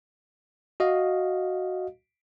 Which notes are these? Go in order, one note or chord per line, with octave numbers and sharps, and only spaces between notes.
F#4 D#5 F5